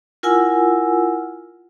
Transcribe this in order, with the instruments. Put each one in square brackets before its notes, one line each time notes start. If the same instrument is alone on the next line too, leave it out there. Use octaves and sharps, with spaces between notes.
[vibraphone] E4 F4 A#4 F#5 G#5 E6